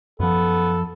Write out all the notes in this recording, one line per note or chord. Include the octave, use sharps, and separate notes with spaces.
F#2 F3 B3 A4